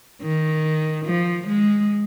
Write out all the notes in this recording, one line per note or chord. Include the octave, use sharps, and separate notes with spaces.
D#3
F3
G#3